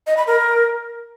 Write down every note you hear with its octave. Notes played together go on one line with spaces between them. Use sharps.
D#5
B5
A#4